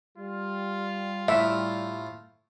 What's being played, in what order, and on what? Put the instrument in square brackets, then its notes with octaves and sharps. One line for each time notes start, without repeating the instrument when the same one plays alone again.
[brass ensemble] G3 [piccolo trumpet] F4
[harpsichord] A2 [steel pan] E5